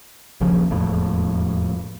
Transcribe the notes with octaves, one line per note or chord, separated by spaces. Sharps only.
D#1 A#1 C#3 F3
E1 F2 A2